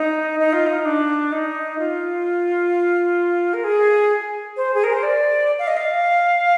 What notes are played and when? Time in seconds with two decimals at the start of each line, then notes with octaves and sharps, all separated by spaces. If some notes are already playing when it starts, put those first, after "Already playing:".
Already playing: D#4
0.40 D#4
0.53 F4
0.67 D#4
0.85 D4
1.32 D#4
1.78 F4
3.54 A#4
3.64 G#4
4.57 C5
4.74 G#4
4.84 A#4
4.93 C5
5.03 D5
5.59 F5
5.68 D#5
5.77 F5